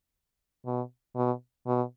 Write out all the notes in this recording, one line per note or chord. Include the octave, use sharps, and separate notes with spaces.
B2
B2
B2